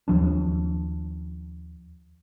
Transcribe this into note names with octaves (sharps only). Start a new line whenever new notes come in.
D#2 F3 D4